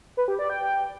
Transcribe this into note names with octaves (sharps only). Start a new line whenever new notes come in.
B4
G4
D5
G5